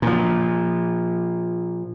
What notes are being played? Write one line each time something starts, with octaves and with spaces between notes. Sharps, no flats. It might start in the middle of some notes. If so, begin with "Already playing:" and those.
A#2 F3